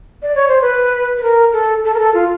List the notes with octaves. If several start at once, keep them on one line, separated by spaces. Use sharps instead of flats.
D5
C#5
C5
B4
B4
A#4
A4
A4
A#4
A4
F4